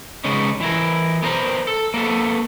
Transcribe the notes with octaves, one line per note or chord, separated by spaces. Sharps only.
C#3 G#3 B3 C#4 D#4
E3 E4 A#4
B3 G#4 A#4 C5 A#5
A4
A#3 B3 A4